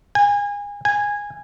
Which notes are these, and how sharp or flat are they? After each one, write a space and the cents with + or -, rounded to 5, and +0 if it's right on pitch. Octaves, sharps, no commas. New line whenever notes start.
G#5 -30
G#5 -15